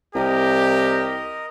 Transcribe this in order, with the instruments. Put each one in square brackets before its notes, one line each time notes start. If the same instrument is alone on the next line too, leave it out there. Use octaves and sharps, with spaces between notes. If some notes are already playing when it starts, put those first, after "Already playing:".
[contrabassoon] C2 [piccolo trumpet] G4 [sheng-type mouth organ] A#4 D#5